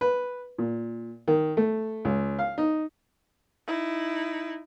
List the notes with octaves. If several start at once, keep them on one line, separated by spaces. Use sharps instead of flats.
B4
A#2
D#3
A3
C#2
F5
D#4
D#4 E4